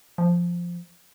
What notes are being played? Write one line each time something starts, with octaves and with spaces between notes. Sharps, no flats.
F3